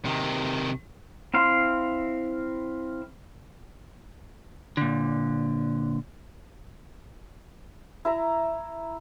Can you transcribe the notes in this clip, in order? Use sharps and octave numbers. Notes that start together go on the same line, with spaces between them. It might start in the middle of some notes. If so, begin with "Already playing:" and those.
C3 D#3
C4 E4 F5 C6
A#2 D3
E4 E5 A#5